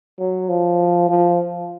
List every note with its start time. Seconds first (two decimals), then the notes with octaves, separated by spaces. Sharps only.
0.19 F#3
0.49 F3
1.09 F3